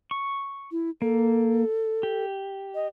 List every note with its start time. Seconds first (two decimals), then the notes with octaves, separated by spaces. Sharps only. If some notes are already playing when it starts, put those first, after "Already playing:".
0.11 C#6
0.71 E4
1.02 A#3 A4
2.03 G4
2.75 D#5